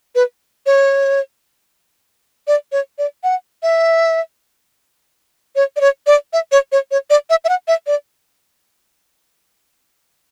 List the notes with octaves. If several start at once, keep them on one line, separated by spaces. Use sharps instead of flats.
B4
C#5
D5
C#5
D5
F#5
E5
C#5
D5
C#5
D5
E5
C#5
C#5
C#5
D5
E5
E5
F#5
E5
D5